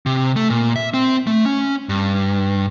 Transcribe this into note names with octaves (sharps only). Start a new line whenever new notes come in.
C3
A3
A#2
E5
C4
A3
C#4
G2